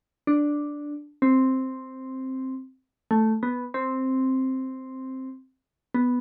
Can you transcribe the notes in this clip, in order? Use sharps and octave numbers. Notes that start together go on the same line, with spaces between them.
D4
C4
A3
B3
C4
B3